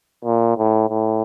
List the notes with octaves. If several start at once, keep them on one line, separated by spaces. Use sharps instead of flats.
A#2
A2
A2